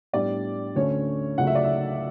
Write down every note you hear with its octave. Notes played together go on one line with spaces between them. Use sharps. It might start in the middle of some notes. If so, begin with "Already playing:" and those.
A2 G3 B3 D4 D5
D2 D3 A3 C#4 C#5
C#2 C#3 F#3 A3 F#5
E5
D5
E5